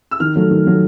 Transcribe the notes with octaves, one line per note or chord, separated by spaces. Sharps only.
E6
D#3 F6
F#3 A3
D#3
F#3 A3